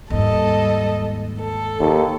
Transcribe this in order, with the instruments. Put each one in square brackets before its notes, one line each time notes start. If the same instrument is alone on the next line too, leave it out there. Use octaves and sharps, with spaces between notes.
[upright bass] D#2 G#2 [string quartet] G3 A4 D#5
[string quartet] A4
[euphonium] D#2 [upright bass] D#4